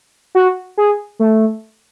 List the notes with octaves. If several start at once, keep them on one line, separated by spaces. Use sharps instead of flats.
F#4
G#4
A3